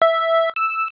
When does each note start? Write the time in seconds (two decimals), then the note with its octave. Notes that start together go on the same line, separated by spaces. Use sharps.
0.02 E5
0.56 E6